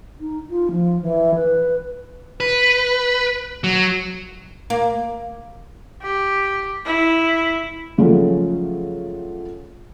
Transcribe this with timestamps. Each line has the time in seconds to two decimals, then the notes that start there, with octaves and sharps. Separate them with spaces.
0.20 D#4
0.50 F4
0.71 F3
1.02 E3
1.35 B4
2.40 B4
3.64 F#3
4.70 A#3
6.02 G4
6.85 E4
7.98 C#3 F3 F#3 G#3 A3 C#4